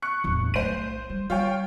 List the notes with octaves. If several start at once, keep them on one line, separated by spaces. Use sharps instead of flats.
C#6 F#6 C#7
D1 E2
B1 A3 C5 D#7
G3
G3 F4 C#5 G5